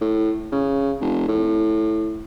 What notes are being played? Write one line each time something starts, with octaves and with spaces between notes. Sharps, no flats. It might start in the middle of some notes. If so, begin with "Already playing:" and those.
A2
C#3
F1
A2